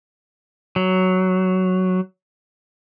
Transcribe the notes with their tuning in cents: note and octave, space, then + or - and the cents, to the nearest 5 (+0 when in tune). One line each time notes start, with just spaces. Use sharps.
F#3 +5